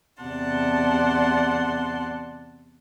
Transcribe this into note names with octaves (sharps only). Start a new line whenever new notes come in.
E2 C3 D5 F#5 A5 C6